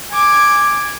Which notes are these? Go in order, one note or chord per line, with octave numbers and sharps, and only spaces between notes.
G#5 D6 G#6